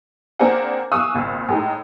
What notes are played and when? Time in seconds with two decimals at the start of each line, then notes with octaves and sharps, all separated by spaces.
0.39 A#3 C4 D4 G#4 F#5
0.92 F5 G#5 C#6 D#6 E6 F#6
1.14 G#1 C#2 A#2
1.49 A2 G#3 D#4